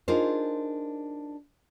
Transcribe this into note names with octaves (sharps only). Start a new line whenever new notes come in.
D4 D#4 F4 G#4 A#4 C5